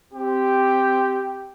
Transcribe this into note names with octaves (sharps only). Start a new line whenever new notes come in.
C4 G4